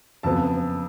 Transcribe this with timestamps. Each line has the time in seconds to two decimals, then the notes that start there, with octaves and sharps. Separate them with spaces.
0.23 F2 C#3 F#3 B3 A5